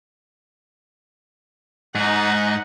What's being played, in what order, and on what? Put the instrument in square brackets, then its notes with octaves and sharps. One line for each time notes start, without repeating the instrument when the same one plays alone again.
[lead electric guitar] G#2 [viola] D#4 F#5